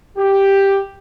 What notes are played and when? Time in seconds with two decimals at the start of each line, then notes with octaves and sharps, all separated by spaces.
0.18 G4